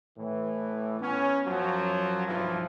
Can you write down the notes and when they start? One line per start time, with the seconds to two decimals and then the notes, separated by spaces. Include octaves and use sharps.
0.17 A2 E3
1.00 B3 C#4
1.45 F#2 F3 F#3
2.27 B1 G2 E3 F3